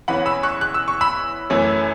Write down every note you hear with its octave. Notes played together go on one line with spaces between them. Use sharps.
E2 E3 C#4 F#5 B5
B5 E6
C#6 F#6
F#6
E6
C#6
B5 E6
F#2 E3 A3 C#4